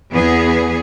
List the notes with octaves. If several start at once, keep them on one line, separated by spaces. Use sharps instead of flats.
E2 B3 G#4